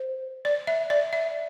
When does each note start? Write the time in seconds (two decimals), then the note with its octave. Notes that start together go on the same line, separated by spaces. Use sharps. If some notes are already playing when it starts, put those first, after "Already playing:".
Already playing: C5
0.45 D5
0.67 E5
0.90 D5
1.13 E5